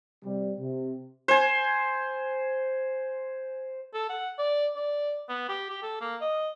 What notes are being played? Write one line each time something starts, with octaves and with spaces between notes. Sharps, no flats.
C3 G3
C3
C5 G#5
A4
F#5
D5
D5
B3
G4
G4
A4
A#3
D#5